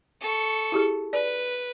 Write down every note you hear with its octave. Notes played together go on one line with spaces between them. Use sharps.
A4 C#6
E4 G4 G#4
B4 D5